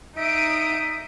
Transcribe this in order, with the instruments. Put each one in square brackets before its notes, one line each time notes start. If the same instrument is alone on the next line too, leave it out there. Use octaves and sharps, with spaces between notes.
[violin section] D#4 D#6 D7 [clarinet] E5